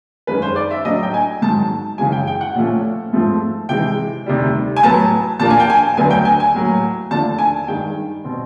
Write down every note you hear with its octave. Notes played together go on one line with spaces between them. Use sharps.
F#2 D#3 G#3 C#4 B4
C5
D5
E5
A2 F#3 A3 D4 D#5
G5
G#5
G#2 D#3 F#3 A5
F#2 C#3 E3 G#3 G#5
G5
G5
F#5
A#2 F3 A3 C#4
G#2 F3 A3 C4
C3 E3 G#3 G5
D2 C3 D#3 G3
G#5
A2 F#3 B3 A5
A#2 F3 A#3 D4 A5
G#5
G5
G#5
D2 D3 F#3 B3 G#5
G5
G#5
G#5
A2 F#3 A#3
D#2 D3 F3 A3 D4 A5
G#5
G2 D#3 G#3 G5
B2 G3 C4